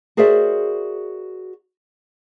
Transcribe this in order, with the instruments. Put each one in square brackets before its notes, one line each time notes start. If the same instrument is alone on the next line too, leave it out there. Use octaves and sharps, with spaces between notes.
[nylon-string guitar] F#4 G#4 A#4 C5 D5 E5